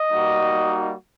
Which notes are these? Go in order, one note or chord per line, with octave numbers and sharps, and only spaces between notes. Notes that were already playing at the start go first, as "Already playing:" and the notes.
Already playing: D#5
G3 A#3 D#4 F#4